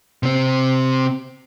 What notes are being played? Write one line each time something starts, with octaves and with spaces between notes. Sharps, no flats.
C3 C4